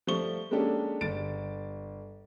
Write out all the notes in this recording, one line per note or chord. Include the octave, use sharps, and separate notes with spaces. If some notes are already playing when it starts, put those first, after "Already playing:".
F3 G3 A3 C#6 G7
G#3 A#3 C#4 D4 G4 A4
G1 A6 D7